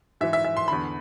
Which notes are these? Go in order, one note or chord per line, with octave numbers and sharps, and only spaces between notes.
G#2 E3 E5
E5
E5
C6
E2 D3 B5